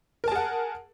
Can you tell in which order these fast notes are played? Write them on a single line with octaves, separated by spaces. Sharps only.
A#4 A5 G#4 F#5